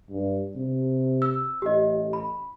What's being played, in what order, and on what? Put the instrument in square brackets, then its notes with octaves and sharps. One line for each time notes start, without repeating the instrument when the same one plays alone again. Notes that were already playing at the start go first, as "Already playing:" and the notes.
[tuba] G2
C3
[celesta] E6
[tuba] A1 [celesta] G4 D#5
[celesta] B5